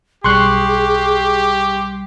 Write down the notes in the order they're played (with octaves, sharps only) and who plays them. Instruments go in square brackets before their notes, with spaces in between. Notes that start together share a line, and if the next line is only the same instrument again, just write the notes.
[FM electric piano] B1 G3 C7 [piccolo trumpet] G4 [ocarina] G#4 [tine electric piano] C6 C#6 F#6